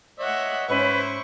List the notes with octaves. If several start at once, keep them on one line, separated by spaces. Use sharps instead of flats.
C#5 D#5 E5 F#5
G#2 C#4 E4 B4 C5 C#6